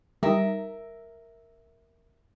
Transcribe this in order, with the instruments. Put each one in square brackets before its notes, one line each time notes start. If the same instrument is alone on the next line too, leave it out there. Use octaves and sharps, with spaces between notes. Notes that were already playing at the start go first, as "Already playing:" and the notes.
[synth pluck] G3 D#4 [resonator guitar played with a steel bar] A#4 E5